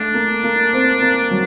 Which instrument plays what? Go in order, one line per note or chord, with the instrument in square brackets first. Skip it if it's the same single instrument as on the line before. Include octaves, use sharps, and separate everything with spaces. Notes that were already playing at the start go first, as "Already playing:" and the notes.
Already playing: [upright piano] A3 [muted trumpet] D4
[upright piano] A#3
A#3
C4
A#3
F#3